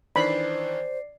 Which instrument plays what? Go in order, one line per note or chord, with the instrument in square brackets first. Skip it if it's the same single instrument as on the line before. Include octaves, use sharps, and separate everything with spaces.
[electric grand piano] D#3 E3 D4 [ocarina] C5 [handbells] D5 C7 [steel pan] B5